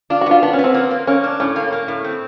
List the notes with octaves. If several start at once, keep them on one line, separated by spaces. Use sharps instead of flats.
D4 F4
F#4
B3 F4
B3 D4
C#4
B3
C4
A#3
A#3
A#3 C#4
D4
A2 C#4
A#3
A#3
A2
C4